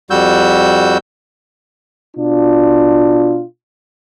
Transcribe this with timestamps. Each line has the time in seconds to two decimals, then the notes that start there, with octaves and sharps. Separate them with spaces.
0.10 F2 G3 F#4 E6 G6
2.17 B2 D4 F4